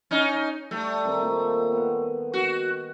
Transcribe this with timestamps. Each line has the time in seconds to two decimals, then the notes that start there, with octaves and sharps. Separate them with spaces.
0.11 C#4 D#4
0.71 G3 A3 D5
1.05 D#3 G3 C4
1.21 A#2 G5
1.72 B3 F#5
2.34 F#4